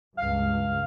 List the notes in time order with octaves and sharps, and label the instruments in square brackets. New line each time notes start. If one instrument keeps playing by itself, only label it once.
[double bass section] C#2 G2 [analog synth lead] F5